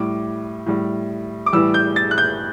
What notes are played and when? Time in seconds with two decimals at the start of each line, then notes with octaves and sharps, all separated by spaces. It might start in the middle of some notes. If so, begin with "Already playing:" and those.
Already playing: A2 G3 D6
0.66 A2 G3
1.46 D6
1.53 A2 E3 G3 E6
1.74 G6
1.96 A6
2.11 F#6
2.18 G6